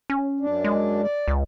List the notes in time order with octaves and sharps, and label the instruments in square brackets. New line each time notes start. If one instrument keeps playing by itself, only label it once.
[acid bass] C#4
[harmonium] F#2 D4
[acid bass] G#3
[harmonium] D5
[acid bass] C#2